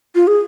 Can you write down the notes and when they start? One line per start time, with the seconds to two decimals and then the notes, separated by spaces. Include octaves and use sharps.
0.15 F4
0.27 G#4